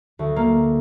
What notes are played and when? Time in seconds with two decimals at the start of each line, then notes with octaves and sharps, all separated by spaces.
0.19 D2
0.36 A#3